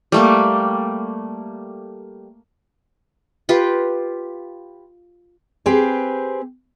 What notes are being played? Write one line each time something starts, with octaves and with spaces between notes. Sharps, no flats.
G3 A3 A#3
F4 G4 B4
C4 G4 G#4 B4